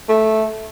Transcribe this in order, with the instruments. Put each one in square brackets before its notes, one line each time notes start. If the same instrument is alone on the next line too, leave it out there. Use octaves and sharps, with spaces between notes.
[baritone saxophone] A3